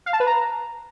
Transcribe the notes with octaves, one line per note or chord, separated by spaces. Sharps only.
F5
A5
B4
A#5